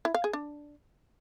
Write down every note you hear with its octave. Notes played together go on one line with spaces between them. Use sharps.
E4
F5
G#4
D4